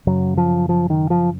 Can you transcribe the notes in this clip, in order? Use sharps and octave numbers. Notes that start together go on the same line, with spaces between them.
F#2 C#3 F#3
F3
F3
D#3
F3